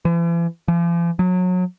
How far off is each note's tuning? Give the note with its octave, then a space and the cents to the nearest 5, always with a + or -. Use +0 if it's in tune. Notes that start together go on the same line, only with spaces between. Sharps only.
E3 +45
F3 -45
F#3 -25